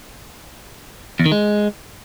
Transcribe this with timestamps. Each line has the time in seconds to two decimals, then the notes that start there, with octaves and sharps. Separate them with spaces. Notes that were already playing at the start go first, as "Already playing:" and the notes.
1.20 E2
1.26 D#3
1.32 G#3